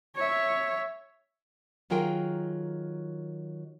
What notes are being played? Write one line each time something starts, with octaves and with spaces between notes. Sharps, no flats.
C#5 E5
D#3 F#3 F4 G#4 A#4 G5